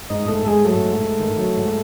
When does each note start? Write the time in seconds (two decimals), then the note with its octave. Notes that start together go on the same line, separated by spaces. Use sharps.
0.10 G#2 D#4 D#5
0.28 G#2 A3 A4
0.46 G#2 G#3 G#4
0.65 F#3 A3 A4
0.84 G#2
1.01 G#2
1.20 D#3
1.38 F#3
1.57 G#2